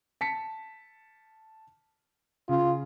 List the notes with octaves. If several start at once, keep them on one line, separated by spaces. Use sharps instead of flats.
A5 B6 C#7
C#3 F4